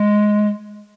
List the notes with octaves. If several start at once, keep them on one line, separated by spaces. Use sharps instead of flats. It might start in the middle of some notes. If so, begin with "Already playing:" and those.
Already playing: G#3